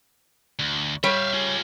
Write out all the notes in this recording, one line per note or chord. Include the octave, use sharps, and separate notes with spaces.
D2
G3 C#5 E5 F5
F4 G#4